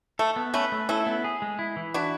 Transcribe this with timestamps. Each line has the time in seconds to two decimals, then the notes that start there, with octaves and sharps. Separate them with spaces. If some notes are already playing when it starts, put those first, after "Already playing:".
0.19 A3 A4
0.36 B3
0.54 A3 C#4 B4
0.72 A3
0.89 C#4 E4 A4
1.07 B3
1.24 G#4
1.42 G#3
1.59 E4
1.76 E3
1.94 D4 E4 F#4